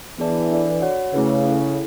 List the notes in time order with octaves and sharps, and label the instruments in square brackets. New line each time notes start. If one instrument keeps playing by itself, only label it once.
[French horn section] E3 [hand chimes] B3 D4 G#4 D5 A5
[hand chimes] D4 A4 D5
F#4 C#5 F#5
[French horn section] C#3 [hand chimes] A3 E4 B4
[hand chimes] C#4 E4 A4